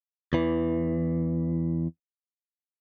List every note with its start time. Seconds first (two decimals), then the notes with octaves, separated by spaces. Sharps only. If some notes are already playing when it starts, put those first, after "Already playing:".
0.33 E2 E3